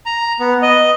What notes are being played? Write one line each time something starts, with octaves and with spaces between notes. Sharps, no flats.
A#5
B3
D#5